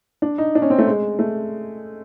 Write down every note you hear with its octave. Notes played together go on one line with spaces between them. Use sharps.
D4
D#4
D4
C#4
C4
A3
G#3
A3